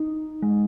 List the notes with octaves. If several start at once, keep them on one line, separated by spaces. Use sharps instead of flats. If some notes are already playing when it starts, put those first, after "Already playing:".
Already playing: D#4
G#3